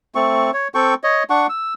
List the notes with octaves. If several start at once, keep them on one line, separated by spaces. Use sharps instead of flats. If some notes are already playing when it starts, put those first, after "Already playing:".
A3 C4 C#6
C#5
C4 A4 G5 C#6
C#5 D#5
D4 F#5 C#6
E6